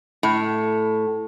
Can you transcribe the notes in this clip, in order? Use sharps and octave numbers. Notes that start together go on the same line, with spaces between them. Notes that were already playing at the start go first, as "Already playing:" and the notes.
A2